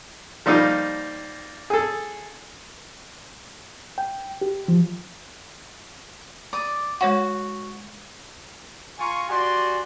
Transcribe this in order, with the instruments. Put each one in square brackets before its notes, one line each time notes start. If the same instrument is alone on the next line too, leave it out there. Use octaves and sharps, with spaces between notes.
[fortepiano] F3 G3 A#3 D#4
G#4 A4
[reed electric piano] G5
G4
F3
[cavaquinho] D5 D#6
[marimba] G#3 C#5 F#5 [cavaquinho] F#4
[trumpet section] F4 G#5 A#5 C#6
F#4 G4 D5 G#5 C6